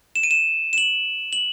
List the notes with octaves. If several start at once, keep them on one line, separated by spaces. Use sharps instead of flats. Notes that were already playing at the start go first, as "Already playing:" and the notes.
E7
D#7
E7
E7
F#7
F#7